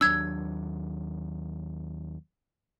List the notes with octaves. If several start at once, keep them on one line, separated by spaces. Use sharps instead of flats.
D#2 F#3 D4 E6 G#6